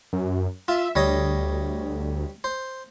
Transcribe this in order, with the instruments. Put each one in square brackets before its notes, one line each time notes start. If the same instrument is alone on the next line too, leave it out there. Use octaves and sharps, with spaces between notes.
[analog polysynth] F#2
[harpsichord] F4 [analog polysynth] E5
[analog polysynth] D2 [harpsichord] G3 C#5 D#5
[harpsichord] C5